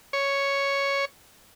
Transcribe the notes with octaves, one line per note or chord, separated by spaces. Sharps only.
C#5